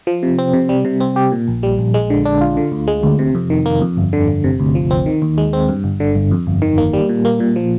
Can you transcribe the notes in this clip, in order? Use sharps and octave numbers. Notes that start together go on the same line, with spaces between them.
F3
C3
C4
C3
G3
C3
C4
G4
A#2
A#1
G3
A#1
G#3
D3
D4
F4
D3
D2
G#3
D2
C3
F2
D#3
A#3
F2
G1
D3
G1
C3
D2
F3
C4
D#3
D#2
G#3
C4
G2
G1
D3
G1
F2
G1
D#3
A#3
G3
A#2
A#3
A#2
F3